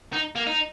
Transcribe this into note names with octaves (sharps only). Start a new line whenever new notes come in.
D#4
A#3
D#4